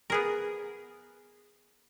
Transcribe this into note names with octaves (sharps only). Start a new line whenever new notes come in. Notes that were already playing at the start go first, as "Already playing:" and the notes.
B3 G#4 A#4